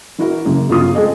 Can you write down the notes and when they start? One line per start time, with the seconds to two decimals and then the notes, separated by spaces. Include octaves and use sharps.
0.18 E3 E4 F#4 A#4
0.45 F#2 C#3 A#3
0.69 G1 F#2 C#3 F4 D#6
0.95 G#3 A3 C4 G#4 A4 D#5